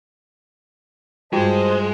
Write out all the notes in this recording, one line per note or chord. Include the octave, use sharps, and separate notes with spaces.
G2 G#3 F4 F#4 C5 D#5 G5 A5